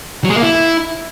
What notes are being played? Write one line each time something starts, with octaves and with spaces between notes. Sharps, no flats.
F#3
G#3
A#3
E4